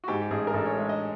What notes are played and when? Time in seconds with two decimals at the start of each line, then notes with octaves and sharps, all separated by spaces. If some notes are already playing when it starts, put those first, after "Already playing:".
0.04 F#4
0.08 G#2 G4
0.21 G4
0.31 A1 G#4
0.47 A#4
0.54 A1 A4
0.66 C#5
0.77 G#3 E5
0.89 D#5